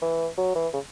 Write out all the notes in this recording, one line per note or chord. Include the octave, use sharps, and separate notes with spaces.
E3
F#3
E3
C#3